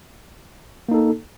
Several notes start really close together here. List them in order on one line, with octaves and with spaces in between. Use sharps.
A#3 D#4 A4